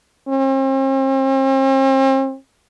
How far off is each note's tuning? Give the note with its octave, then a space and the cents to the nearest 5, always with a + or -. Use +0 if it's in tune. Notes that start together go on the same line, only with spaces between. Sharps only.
C4 +45